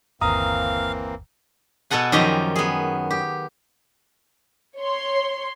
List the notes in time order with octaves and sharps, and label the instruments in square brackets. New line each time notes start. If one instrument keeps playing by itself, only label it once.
[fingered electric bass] G1 D#2 [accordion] E3 A#3 C4 [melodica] F5 [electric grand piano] A#5 D#6
[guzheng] B2 B3 A4 F#5 G#5
F#2 D#3 F3 G4 D#5 A#5
B3 G#4
G4
[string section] C#5 C6